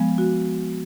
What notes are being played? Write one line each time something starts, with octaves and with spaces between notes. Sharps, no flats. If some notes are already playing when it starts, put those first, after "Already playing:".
Already playing: F3 G#3 B3
F#4